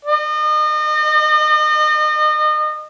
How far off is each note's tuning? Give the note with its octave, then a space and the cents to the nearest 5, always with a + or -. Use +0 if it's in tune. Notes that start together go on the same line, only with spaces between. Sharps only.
D#5 -35